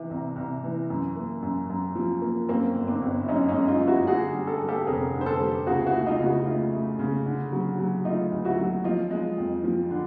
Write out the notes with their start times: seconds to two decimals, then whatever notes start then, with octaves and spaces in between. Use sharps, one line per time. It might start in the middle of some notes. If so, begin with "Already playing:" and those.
Already playing: C3 E3
0.10 C2
0.36 C2
0.64 E3
0.90 F#2
1.16 A#3
1.42 F#2
1.69 F#2
1.95 F3
2.22 A#3
2.49 F#2 A#3 C4
2.75 G1
2.88 C4 D4
3.01 G1
3.20 E4
3.28 F#2 C#4 D#4
3.48 C#4 D#4
3.54 G#3
3.68 D#4 F4
3.81 F#2
3.87 E4 F#4
4.07 D3 F#4 G#4
4.35 G3
4.47 A4
4.58 G3 G#4
4.68 G4 A4
4.87 F1 G#4 A#4
5.14 D3
5.21 C5
5.26 A4 B4
5.40 G3
5.66 C#2 F#4 G#4
5.86 E4 F#4
5.94 A3
6.06 D#4 F4
6.20 C#3
6.26 E4 F#4
6.46 A3 D#4 F4
6.72 A3
6.99 C#3
7.26 D3
7.52 F#3
7.78 F#3
8.04 A3 D#4 F4
8.32 D2
8.44 E4 F#4
8.58 F#3
8.84 F3 D#4 F4
9.11 G#3
9.38 F2
9.64 F3
9.91 D3